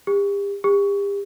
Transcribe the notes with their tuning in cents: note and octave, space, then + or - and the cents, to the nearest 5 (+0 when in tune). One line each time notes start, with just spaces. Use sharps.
G4 +40
G4 +40